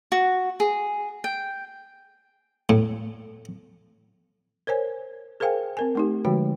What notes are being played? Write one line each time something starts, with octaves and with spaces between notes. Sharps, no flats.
F#4
G#4
G5
A2
A#4 C5 C#5 G#5
G#4 A#4 C5 F5 G5 G#5
C4 A#4 G#5
A3 D#4 G4
D3 F3 G#3 F#4 G5